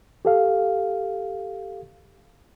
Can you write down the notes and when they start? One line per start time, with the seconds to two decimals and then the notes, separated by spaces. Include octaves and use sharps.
0.25 G4 A4 F5